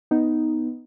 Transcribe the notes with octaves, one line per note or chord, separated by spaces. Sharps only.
B3 D#4